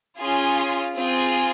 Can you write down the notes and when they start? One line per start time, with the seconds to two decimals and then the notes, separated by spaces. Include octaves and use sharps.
0.20 C#4 F4 G#4 G#5 C6
0.97 C4 F4 G#4 G#5 C6